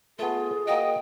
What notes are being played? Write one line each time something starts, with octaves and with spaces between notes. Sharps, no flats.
A3 B3 F4 G#4
A#3 F#4 D#5 G5